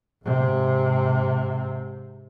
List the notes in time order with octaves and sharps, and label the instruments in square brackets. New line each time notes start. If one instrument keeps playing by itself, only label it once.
[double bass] G#2 C3